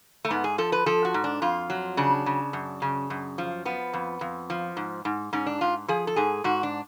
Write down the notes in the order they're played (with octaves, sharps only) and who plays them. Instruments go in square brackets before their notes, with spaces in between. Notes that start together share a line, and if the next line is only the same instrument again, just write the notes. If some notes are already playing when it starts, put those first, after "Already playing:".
[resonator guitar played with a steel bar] A3
G#2 B3
G#4
F3 A4
B4
F3 A4
F#4
G#2
D4
F2 F4
F#3
C#3 D4
C#3
F#2
C#3
F#2
F3
F3 B3
F2
F2
F3
G#2
G#2
G#2 C#4
D4
G#2 F4
F3 G#4
A4
G#2 G#4
G#2 F#4
D4